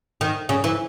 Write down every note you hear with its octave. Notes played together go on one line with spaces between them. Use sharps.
D#3
C#3
E3